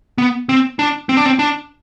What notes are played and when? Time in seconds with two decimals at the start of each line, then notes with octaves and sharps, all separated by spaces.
0.18 B3
0.49 C4
0.79 D4
1.09 C4
1.17 D4
1.26 C4
1.39 D4